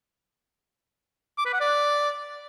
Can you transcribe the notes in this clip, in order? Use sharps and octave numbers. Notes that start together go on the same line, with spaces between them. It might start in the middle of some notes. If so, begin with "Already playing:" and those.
D6
B4
F#5
D5